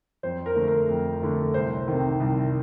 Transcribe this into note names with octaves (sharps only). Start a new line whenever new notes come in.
F2 C5
A#4
D3 A3
A#4
F2
D3 A3
C2 C5
C3 D#3
C2